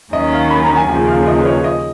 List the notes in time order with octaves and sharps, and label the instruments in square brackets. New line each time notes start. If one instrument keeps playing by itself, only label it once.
[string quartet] D#2 D#3 F#3 C#4 [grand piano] D#5
[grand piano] F5
B5
A#5
G#5
[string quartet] D#2 C#3 F3 [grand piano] G#5
[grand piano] F5
D#5
B4
C#5
D#5